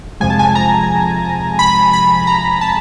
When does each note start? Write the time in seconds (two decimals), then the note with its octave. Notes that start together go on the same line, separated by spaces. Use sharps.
0.20 F2 C3 F3 G#3 G#5
0.30 A5
0.39 G#5
0.55 A#5
1.59 B5
1.93 B5
2.27 A#5
2.61 A5